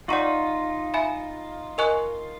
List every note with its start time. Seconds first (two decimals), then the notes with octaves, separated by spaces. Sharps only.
0.08 D#4 F4 D5 F#5 A#5 C#6
0.94 E5 G#5 B5
1.78 A#4 D#5 G#5 C#6 F#6